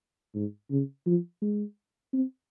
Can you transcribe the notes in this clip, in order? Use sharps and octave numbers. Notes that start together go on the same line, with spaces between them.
G#2
C#3
F3
G#3
C4